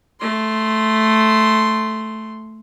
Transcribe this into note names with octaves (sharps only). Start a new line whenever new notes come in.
A3 C6